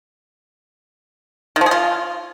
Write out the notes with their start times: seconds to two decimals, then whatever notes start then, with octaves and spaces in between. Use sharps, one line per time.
1.56 D#3
1.61 F3
1.66 G#4
1.71 F4